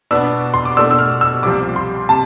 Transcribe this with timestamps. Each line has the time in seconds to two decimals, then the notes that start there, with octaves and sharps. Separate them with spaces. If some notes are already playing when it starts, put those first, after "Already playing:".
0.11 B2 B3 D4 E6
0.54 C6
0.65 D6
0.77 B2 A3 D4 E6
0.91 E6
0.99 F6
1.21 E6
1.43 C2 C3 F3 C4 D6
1.76 C6
2.09 C3 A5